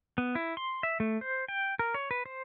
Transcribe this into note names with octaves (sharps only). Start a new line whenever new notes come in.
B3
E4
C6
E5
A3
C5
G5
A#4
C#5
B4
C5